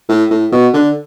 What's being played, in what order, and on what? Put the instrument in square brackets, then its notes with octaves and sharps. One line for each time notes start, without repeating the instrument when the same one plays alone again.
[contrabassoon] A2
A2
B2
D3